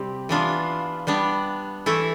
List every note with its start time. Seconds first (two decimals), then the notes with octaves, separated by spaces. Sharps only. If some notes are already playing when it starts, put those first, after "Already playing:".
Already playing: C3 G3 C4 G4
0.29 E3 B3 D4 F4
1.07 G3 B3 D4
1.86 E3 A3 E4 A4